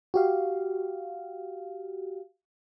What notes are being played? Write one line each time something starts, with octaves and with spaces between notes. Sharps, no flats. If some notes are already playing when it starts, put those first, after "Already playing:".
F#4 G4 F5